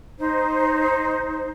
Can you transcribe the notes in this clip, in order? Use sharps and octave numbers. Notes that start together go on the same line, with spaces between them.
D#4 C5